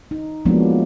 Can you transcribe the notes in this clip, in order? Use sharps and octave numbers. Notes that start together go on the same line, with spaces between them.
D#4
F3 F#3 G#3 A#3 B3 D4